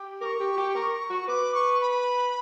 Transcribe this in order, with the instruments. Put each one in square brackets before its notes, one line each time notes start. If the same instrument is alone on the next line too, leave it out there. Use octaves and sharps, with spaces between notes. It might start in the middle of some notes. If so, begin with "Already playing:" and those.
Already playing: [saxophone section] G4
[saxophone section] A#4 [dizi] C#6 D6
[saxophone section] G4
G4
A#4
F#4
[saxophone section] B4 [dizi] D6
[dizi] C#6
B5